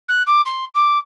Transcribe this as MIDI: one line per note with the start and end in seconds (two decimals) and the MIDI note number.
0.08 0.22 90
0.26 0.41 86
0.45 0.65 84
0.74 0.98 86